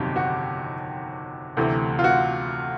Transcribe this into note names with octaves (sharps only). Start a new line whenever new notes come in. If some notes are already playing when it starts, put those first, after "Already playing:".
Already playing: G1 F2 C3 D#3 F#3 G4
F#4
D2 C3 E3 A3
F4
F#4